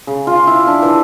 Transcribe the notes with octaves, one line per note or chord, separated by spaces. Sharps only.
C#3
F4
E4
D4
E3